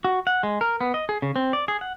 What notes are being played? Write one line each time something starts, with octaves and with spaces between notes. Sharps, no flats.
F#4
F#5
G#3
A#4
B3
D#5
G#4
C#3
C4
D5
G#4
F#5